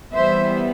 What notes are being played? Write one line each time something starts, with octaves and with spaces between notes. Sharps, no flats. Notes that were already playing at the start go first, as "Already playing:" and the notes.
E3 G3 B3 C5 E5